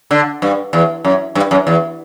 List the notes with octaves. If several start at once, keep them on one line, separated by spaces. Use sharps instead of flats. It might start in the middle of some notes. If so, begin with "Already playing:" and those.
D3
G2
E2
F#2
G2
F#2
E2